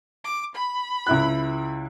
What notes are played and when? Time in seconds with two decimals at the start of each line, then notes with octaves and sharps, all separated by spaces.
0.24 D6
0.55 B5
1.06 C#2 E4 F#6